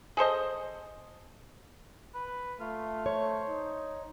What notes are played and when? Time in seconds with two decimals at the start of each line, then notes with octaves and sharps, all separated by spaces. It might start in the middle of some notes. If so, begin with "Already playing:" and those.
0.17 G#4 A4 C5 D#5
2.14 B4
2.60 A3 F4
3.06 C5 C#5
3.49 D#4